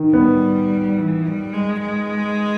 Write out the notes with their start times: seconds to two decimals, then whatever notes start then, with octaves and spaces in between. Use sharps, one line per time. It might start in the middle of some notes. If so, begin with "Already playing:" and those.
Already playing: D#3
0.13 G3 B3
0.97 E3
1.26 G3
1.53 G#3
1.81 G#3